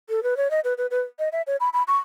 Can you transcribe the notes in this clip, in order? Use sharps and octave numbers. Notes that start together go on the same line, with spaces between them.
A4
B4
C#5
D#5
B4
B4
B4
D#5
E5
C#5
B5
B5
C#6